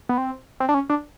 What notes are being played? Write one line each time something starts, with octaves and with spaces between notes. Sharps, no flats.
B3
C4
C4
D4
C#4
D4